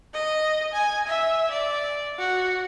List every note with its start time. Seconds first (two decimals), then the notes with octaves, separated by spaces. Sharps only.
0.14 D#5
0.74 G#5
1.08 E5
1.51 D5
2.19 F#4